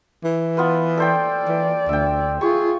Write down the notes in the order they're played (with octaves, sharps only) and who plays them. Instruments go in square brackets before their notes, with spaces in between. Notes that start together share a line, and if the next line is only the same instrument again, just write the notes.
[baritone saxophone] E3
[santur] B3 F4 B4
[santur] A4 C5 G5 [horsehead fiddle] D5
[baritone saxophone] E3
[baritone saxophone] D2 [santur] E5 G5
[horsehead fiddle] F4 [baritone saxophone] G#4 [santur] C#6